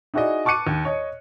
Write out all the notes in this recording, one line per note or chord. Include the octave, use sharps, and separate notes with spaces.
D#4 E4 F#4 G#4 D5 D#5
A5 C#6 D6 F#6 C#7 D#7
D#2
C#5 D#5